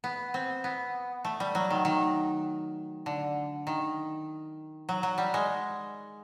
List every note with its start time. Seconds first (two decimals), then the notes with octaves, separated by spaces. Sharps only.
0.04 B3
0.34 C4
0.64 B3
1.25 A3
1.40 G3
1.55 F#3
1.70 D#3
1.85 D#3
3.06 D3
3.67 D#3
4.89 F#3
5.03 F#3
5.18 G3
5.34 G#3